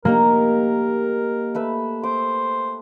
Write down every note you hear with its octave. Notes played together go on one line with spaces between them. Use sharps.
A#3 D#4 G4 A#4 A#5
A3 B4 E5
C5 D6